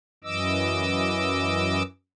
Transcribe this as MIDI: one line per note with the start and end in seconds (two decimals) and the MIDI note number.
0.24 1.83 42
0.24 1.83 52
0.24 1.83 75
0.24 1.83 86
0.24 1.83 88